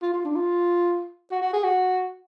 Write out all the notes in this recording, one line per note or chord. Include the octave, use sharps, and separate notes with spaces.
F4
F4
D4
F4
F#4
F#4
G#4
F#4